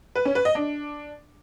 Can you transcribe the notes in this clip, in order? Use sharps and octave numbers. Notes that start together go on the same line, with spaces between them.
B4
C#4
B4
D#5
D4